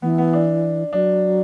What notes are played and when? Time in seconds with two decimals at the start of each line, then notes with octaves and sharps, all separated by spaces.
0.02 E3 B3
0.18 B3
0.33 D4
0.93 F#3 D4